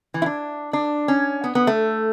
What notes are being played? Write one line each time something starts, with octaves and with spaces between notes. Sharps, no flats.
E3
E4
D4
D4
C#4
B3
B3
A3